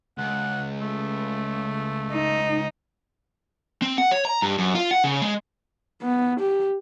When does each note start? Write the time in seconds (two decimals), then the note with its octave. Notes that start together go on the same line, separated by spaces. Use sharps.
0.18 C#2 F#5
0.81 A3
2.12 D#4
3.82 C4
3.98 F#5
4.11 C#5
4.25 A#5
4.42 G2
4.58 F#2
4.75 F4
4.91 F#5
5.04 C#3
5.22 G#3
6.02 B3
6.40 G4